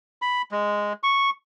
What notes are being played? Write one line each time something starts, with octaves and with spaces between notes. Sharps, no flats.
B5
G#3
C#6